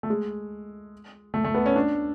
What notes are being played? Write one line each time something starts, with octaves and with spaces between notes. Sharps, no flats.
A3
G#3
A3
A3
B3
C#4
D4